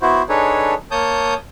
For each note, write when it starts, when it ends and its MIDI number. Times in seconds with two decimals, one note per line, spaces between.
0.02 0.22 59
0.02 0.22 64
0.02 0.22 66
0.02 0.22 72
0.29 0.74 62
0.29 0.74 63
0.29 0.74 68
0.29 0.74 69
0.29 0.74 71
0.29 0.74 73
0.91 1.34 58
0.91 1.34 73
0.91 1.34 81
0.91 1.34 87
0.91 1.34 91